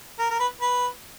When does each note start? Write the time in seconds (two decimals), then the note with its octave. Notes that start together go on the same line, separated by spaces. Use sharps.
0.19 A#4
0.30 A#4
0.40 B4
0.61 B4